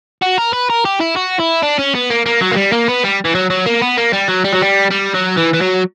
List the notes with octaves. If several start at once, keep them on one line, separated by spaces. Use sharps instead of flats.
F#4
A#4
B4
A#4
G4
E4
F#4
E4
D4
C#4
B3
A#3
A#3
F#3
A#3
G3
A#3
B3
G3
E3
F#3
F#3
A#3
B3
A#3
G3
F#3
G3
F#3
G3
G3
F#3
E3
E3
F#3